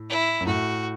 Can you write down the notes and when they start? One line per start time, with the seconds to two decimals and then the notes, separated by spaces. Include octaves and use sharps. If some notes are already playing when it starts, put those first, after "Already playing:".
Already playing: A2
0.09 E4
0.41 F#2
0.46 A2 F#4